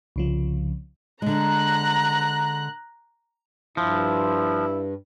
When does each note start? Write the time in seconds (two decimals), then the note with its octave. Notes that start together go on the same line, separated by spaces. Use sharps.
0.16 C2 C#3 F3
1.22 D3 G#3 A#5 F#6
3.77 G2 F3 E4